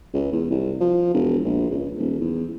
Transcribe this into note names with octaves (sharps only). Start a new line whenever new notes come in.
C#2
E2
C2
F3
E1
A#1
C#2
D#1
E2